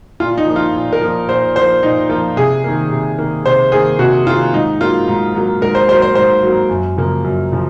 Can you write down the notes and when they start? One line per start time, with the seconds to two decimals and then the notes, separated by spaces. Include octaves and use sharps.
0.20 A#2 F4
0.38 D#4
0.47 F3 A#3
0.56 F4
0.74 A#2
0.93 A#4
1.01 F3 A#3
1.28 A#2 C5
1.55 F3 C5
1.60 A#3
1.83 A#2 D#4
2.09 F3 A#3 F4
2.36 C3 G#4
2.64 D#3 A#3
2.91 C3
3.18 D#3 A#3
3.45 C3 C5
3.71 D#3 A#3 G#4
3.99 C3 F#4
4.26 D#3 A#3 F4
4.53 G#2 D#4
4.81 F#3 A#3 F4
5.08 G#2
5.35 F#3 A#3
5.61 G#2 A#4
5.75 C5
5.89 F#3 C5
5.92 A#3
6.02 C5
6.15 G#2 C5
6.43 F#3 A#3
6.70 F#2
6.97 C#3 F3 A#3
7.24 F#2
7.52 C#3 F3